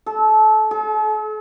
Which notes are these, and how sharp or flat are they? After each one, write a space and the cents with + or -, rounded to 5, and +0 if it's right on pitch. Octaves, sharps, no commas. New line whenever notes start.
A4 -25
A4 -45